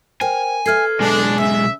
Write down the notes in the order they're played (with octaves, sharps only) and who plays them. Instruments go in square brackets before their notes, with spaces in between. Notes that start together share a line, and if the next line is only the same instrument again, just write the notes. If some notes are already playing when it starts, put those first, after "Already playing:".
[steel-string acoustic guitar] A#4 [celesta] C5 G5 [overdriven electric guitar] G#5
[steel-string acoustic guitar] A4 B4 E5 [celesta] F6 G#6 C7
[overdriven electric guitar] B1 G#3 [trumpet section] D4 [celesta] G#5
[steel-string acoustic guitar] C#3 [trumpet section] E5